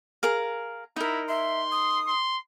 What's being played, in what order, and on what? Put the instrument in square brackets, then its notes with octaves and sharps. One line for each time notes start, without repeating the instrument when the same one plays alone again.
[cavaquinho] G#4 A#4 F5
[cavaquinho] D#4 A#4 [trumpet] E4
[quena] E5 [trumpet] C6
[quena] D#6
[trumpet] C6